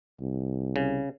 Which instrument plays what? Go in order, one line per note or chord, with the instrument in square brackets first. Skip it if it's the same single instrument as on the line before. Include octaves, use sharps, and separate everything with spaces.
[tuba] C2
[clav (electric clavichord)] C#3